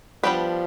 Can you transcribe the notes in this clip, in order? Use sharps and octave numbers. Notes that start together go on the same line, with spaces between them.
F3 G3 B3 D4 G4 B4